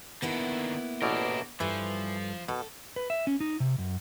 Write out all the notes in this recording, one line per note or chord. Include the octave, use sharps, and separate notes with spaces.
D3 D#3 A#3 B3 E4
A1 B2 D4 A#4 D5
G2 E3 F3 A4
B2 A4
B4
E5
C#4
D#4
C3
F#2